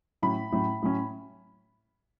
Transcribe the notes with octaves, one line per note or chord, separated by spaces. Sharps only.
A2 F#3 C#4 B5
A2 F#3 C#4
A2 F#3 C#4